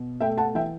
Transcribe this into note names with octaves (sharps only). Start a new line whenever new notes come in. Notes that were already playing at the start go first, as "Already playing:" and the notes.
Already playing: B2
A3 E5 G5
F#5 A5
E3 E5 G5